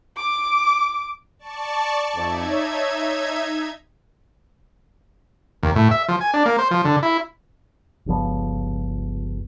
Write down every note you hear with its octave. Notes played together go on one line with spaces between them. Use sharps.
D6
D5 A5 C#6
F2 D#4 E5 G#6
C#5
D#2
A2
E5
F3
G#5
D4
A#3
C5
F3
D3
E4
G1 C#2 F3 B3